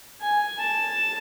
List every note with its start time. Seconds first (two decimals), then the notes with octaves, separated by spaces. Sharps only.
0.21 G#5
0.59 A5